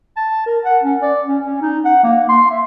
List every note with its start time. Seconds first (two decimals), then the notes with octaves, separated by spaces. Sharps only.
0.16 A5
0.46 A#4
0.65 F#5
0.83 C#4
1.02 D5
1.27 C#4
1.45 C#4
1.62 D#4
1.85 F#5
2.03 A#3
2.29 C6
2.50 E5